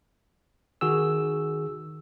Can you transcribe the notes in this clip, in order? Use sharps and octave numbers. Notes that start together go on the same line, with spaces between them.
D#3 F#4 G#4 E6